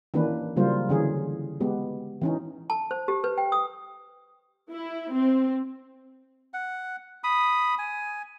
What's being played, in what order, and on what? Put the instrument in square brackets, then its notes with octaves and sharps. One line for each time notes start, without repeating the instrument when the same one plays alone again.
[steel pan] D#3 E3 A#3 C#4 D4 B4
C#3 F#3 G3 A#3 F4 C5
D3 E3 C#4 G#4
G#3 B3 G4
E3 C#4 D#4
[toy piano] A5
C5
G4
B4
G5
D#6
[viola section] E4
C4
[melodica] F#5
B5 D#6
G#5